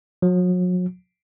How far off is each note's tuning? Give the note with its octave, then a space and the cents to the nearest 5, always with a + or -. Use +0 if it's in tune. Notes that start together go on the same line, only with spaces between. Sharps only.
F#3 -40